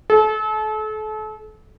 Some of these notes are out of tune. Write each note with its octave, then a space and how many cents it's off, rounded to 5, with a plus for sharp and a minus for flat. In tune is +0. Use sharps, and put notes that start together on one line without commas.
A4 -35